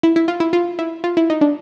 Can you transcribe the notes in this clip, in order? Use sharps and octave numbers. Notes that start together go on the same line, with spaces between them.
E4
E4
F4
E4
F4
E4
F4
E4
D#4
D4